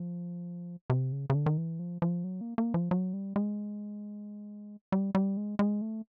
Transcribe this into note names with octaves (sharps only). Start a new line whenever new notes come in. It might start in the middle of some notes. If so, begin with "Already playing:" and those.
Already playing: F3
C3
C#3
C#3
D3
D#3
E3
F3
F3
F#3
A#3
A#3
F3
F#3
G3
G#3
G3
G3
G#3
G#3
A3